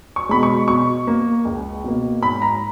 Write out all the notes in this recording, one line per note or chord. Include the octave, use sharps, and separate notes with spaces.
C#6
B2 G#3 B5
C#6
B2 C#6
A#3
C#2
B2 A#3
G#2 B5
A#5